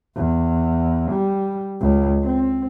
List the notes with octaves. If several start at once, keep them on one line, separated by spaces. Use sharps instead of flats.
E2
G3
C#2
C4